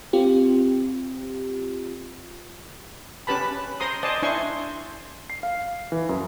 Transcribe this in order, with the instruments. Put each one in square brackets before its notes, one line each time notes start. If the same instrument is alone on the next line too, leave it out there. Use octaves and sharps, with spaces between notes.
[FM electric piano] C4 F4 G4
[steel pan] C#4 G4 B4 A5 B5
C5 A#5 C6 D#6
C5 D5 D#5 G#5 A5
D4 E4 C5 G#5 C6 C#6
[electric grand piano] C7
F5
E3
F#2